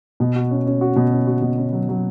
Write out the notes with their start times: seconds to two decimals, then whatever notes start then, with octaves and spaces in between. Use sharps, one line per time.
0.20 B2
0.36 F#4
0.51 C#4
0.67 C#4
0.81 F#4
0.96 B2
1.12 C#4
1.27 F#4
1.42 B2
1.58 C#4
1.73 F#3
1.89 F#3